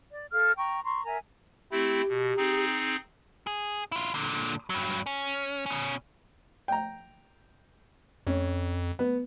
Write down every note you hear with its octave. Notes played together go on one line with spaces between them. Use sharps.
D5
A4 F5 F6
G5 A#5 C#6
A#5 C6 C#6
A#4 E5 G#5 A#5
A3 C4 E4 G4
B2
C4 D#4 G#4
G#4
E4 F4
A#2 D3
G2 F#3
C#4
B2 C#4
G5 A#5
F2 C#4
B3